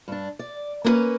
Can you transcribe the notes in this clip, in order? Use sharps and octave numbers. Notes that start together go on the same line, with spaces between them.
G2 D4
D5
A#3 B3 C#4 B4 C#5